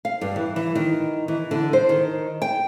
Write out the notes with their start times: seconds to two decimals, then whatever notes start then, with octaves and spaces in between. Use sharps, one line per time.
0.05 F5
0.21 G2
0.36 E3
0.56 E3
0.75 D#3
1.28 E3
1.51 D3
1.73 C5
1.89 D#3
2.42 G5